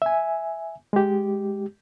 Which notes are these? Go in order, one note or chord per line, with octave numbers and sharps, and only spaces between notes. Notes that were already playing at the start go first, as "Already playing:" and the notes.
E5 G#5
G#3 G4